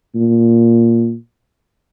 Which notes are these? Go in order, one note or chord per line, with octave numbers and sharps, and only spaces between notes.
A#2